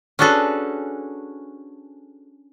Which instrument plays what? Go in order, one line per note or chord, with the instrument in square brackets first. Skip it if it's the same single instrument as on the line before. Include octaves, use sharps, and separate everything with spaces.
[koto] C#4 D4 F#4 G#4 A4 B4